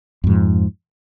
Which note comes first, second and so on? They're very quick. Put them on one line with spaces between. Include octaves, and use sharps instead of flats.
F2 G#2 F3